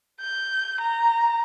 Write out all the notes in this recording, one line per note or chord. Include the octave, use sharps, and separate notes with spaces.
G6
A#5